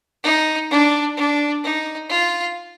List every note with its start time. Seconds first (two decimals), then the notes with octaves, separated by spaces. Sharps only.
0.24 D#4
0.71 D4
1.17 D4
1.63 D#4
2.10 F4